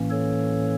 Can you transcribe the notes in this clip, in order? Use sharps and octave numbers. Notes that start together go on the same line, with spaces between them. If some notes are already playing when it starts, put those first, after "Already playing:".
Already playing: A2 E3 A#3 C#4
A4 C#5